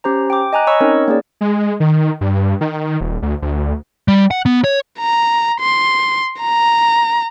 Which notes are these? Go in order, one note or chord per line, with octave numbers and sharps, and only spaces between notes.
C#4 G4 C5 A#5
G5 D6
D#5 G#5 A#5 F#6
C#5 D#5 B5 C#6 E6
C4 C#4 D#4 A#4 C#5
A#3 C#4 G#4 D5
G#3
D#3
G2
D#3
D#1
D2
D2
G3
F#5
B3
C#5
A#5
C6
A#5